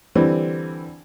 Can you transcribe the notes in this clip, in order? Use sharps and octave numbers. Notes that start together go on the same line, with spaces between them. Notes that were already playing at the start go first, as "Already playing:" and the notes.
D3 E3 G3 C4